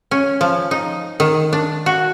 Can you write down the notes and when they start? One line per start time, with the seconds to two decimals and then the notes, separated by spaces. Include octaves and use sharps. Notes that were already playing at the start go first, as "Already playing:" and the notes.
0.11 C#4
0.41 F3
0.71 D#4
1.20 D#3
1.53 D4
1.86 F#4